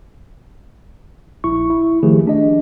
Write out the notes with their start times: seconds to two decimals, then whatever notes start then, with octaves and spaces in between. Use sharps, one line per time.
1.44 A#1 E4 C#6
1.70 E4
2.03 D#3 F3 A3 G4 G#4
2.27 D4 D#5